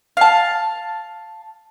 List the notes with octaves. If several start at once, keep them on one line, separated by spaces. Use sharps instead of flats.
F5 A5